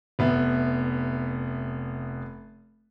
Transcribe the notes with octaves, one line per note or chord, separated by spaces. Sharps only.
F1 B3 E5